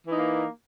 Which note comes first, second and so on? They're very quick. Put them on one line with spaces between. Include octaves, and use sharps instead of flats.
E3 D#4 A#3